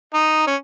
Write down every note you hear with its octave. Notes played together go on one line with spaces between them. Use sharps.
D#4
C#4